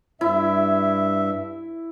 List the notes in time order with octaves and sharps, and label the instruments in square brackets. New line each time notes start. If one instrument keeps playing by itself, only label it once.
[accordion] G2 E5 [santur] E4